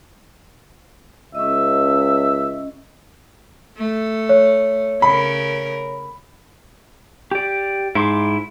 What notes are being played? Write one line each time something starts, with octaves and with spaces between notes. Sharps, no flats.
C#2 C#4 D#5 E5
A3
C#5
C#3 A#4 B5
G4 D5
G#2 E4 C6 D6